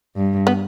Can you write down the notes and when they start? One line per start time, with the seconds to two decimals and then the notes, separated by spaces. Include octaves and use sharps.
0.16 G2
0.47 B3